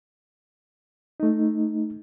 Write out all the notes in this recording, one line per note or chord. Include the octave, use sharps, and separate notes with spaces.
A3 D#4